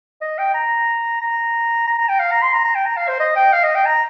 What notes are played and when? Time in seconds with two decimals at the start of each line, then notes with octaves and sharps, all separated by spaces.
0.21 D#5
0.38 G5
0.54 A#5
1.21 A#5
1.87 A#5
1.98 A#5
2.08 G5
2.19 F5
2.31 A#5
2.42 C6
2.53 A#5
2.65 A#5
2.75 G5
2.86 A#5
2.97 F5
3.08 C5
3.20 D#5
3.36 G5
3.53 F5
3.63 D#5
3.75 G5
3.85 A#5